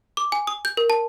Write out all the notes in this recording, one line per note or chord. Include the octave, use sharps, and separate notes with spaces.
D6
G#5
D#6
G6
A#4
A5